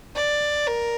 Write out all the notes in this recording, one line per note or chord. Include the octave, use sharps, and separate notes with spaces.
D5
A#4